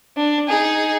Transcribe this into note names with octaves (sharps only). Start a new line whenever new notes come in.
D4
D#4 G#4